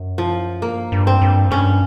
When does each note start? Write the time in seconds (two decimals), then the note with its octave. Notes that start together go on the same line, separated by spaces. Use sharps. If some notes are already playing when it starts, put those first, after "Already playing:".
Already playing: F#2
0.18 F3
0.62 G2 A#3
0.92 G2
1.07 C4
1.22 G2
1.51 G2 C#4